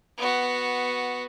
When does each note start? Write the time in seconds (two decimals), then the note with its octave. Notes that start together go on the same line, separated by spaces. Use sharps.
0.17 B3 F#4